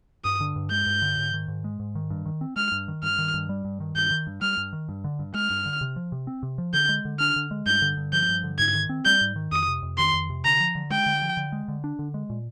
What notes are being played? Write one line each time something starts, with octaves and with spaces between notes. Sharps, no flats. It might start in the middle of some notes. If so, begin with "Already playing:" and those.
G2 D#6
D3
G2
G#3 G6
G2
D3
G#2
D#3
G#2
G#3
G#2
D#3
G2
D#3
C4
G#3 F6
G2
D#3
G2 F6
D#3
G2
G3
G2
D#3
G2 G6
D#3
G2
G3 F6
G2
D#3
G2
D3
G2
G#3 F6
G2
D3
C3
F3
C3
C4
C3
F3
D3 G6
G#3
D3
D4 F6
D3
G#3
G2 G6
D3
G2
F3 G6
G2
D3
G#2 G#6
D#3
C4
G3 G6
G#2
D#3
F2 D#6
C3
F2
D#3 C6
F2
C3
D3 A#5
F3
D3
G#3 G5
D3
F3
D3
G#3
D3
D4
D3
G#3
A#2